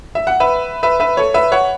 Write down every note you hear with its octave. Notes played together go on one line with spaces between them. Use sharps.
E5
F#5
B4 E5
B4 E5
B4 E5
A4 C#5
B4 E5
C#5 F#5